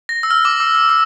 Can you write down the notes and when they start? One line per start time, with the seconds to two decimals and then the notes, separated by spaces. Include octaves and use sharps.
0.09 A#6
0.23 E6
0.31 F6
0.45 D6
0.60 E6
0.75 E6
0.89 E6